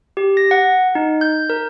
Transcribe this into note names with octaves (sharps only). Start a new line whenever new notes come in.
G4
A#6
F#5
D#4
G6
A#4